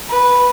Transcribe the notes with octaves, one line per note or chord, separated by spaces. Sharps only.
B4